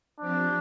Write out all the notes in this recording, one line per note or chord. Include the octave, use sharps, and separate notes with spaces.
F3 C4 D4 G4